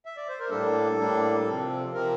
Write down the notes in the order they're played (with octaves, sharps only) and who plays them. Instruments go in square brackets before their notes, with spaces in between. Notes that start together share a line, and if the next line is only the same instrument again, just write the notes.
[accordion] E5
D5
C5
A#4
A2 G3 A#3 D4 A4
A2 G3 A#3 D4
C3 F3 C4
C3 F3 C4 A#4